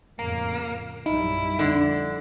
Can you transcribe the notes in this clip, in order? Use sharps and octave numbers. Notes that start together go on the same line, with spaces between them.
F2 A2 C#3 A#3
A#1 F#2 G3 D#4 E4
F2 D3 D#4